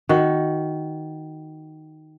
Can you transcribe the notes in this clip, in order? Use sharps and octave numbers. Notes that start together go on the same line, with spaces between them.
D#3 F#4